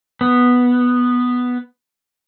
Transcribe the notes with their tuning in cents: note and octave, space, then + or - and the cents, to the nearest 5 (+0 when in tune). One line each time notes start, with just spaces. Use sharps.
B3 +0